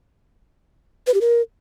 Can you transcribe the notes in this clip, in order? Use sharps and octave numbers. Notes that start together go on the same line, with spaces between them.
B4
G4
A#4